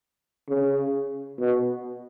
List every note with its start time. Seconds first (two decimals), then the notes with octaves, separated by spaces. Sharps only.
0.48 C#3
1.38 B2